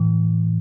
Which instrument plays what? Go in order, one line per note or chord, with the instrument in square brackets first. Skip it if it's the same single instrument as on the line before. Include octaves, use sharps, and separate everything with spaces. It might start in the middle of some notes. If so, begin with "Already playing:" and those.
Already playing: [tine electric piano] A2 E3